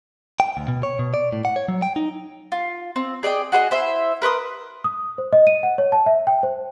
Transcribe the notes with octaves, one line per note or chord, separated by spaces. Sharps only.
G5
D2
B2
C#5
B2
D5
A2
F#5
C#5
F#3
G5
D#4
F4
C4
G#4 D5 D#5 G5
F#4 G#4 C5 D#5
E4 C5 E5
A#4 B4 C6 D#6
D#6
C5
D#5
D#7
F#5
C#5
A5
E5
G5
C5